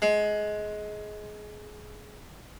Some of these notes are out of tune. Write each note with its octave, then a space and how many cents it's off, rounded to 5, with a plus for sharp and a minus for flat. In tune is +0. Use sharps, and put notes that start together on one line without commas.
G#3 +20